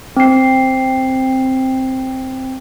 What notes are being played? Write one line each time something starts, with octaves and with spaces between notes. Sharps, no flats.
C4 C7